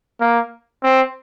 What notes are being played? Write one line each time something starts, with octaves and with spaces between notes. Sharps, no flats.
A#3
C4